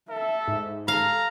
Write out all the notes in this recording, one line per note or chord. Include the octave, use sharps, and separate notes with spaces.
A4 E5
G#2
A4 F5 A#5